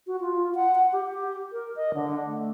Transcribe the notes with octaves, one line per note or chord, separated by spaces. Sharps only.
F#4
F4
F#5
F#5
G4
G4
A#4
D#5
D3
A3